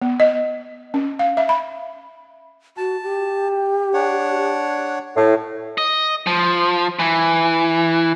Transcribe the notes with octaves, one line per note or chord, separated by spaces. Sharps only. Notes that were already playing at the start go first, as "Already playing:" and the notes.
B3
D#5
C#4
F5
E5
B5
F#4 A5
G4
D4 C#5 F#5
A2 E4
D#5
F3
E3